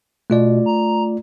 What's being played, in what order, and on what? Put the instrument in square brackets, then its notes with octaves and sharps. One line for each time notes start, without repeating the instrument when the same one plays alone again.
[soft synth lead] B2 [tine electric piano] A3 F4 D5
[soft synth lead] A#5